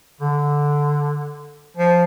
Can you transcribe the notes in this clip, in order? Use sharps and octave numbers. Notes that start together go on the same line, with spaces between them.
D3
F3